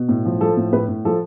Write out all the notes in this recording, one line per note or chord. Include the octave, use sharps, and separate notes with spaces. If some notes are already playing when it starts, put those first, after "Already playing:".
Already playing: B2
A2
F3
F3 A4
A2
A2 B4
A2
F3 A4